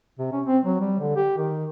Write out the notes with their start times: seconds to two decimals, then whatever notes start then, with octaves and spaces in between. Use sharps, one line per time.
0.19 C3
0.32 C#4
0.46 C4
0.65 F#3
0.81 G3
1.00 D3
1.16 G4
1.37 D#3